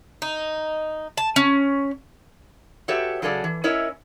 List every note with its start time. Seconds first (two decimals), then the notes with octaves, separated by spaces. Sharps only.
0.22 D#4
1.17 A5
1.36 C#4
2.88 F#4 G4 A4 B4 C#5 E5
3.22 C#3 F#3 G#4 A4 C#5 D5
3.44 E3
3.64 C#4 E4 A#4 C#5 D#5 E5